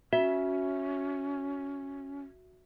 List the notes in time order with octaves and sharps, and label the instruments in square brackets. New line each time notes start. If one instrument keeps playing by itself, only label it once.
[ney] C#4 [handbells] F#4 [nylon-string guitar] E5